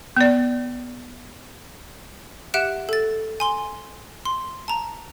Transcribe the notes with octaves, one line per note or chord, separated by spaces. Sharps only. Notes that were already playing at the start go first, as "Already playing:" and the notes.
B3 D5
G4 E5 F#5 F#6 D7 E7
A4 A6
G#5 C6 G7
C6
A5 A#5